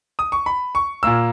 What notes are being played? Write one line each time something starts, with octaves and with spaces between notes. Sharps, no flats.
D#6
C#6
B5
C#6
A#2 A#3 E6